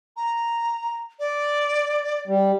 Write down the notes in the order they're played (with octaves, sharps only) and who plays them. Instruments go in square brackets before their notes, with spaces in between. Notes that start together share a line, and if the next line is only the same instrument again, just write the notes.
[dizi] A#5
D5
[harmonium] G3